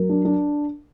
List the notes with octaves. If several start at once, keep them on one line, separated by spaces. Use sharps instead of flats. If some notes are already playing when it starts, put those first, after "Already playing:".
Already playing: F#3 A#4
D4
D4